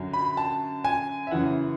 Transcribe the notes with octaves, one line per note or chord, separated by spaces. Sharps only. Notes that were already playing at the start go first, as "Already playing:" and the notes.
Already playing: F#2 D3 F#3
B5
A5
G#5
E5
F#2 C#3 E3 F#5